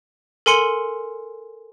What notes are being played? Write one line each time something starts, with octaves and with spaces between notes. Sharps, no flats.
A4 A#4 G#5 C6 C#7 F#7